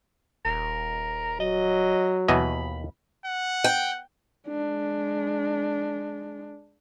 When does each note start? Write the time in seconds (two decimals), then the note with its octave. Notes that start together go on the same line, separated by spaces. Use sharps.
0.45 D#1 A#4
1.40 F#3 D#5
2.28 D#2 B2 E3 D#5 B5
3.26 F#5
3.64 G5
4.48 G#3 D4